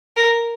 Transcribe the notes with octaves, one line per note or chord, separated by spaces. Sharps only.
A#4